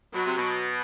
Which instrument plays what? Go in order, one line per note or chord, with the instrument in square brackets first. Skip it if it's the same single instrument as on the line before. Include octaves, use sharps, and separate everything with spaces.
[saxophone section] B2 [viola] F#3
[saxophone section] C3
B2